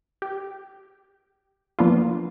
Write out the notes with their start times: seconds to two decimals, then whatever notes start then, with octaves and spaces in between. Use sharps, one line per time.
0.22 G4
1.79 F3 A#3 B3 D4 E4 F4